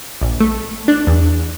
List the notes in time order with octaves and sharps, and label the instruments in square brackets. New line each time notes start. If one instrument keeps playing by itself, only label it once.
[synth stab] A#1
A3
D4
E2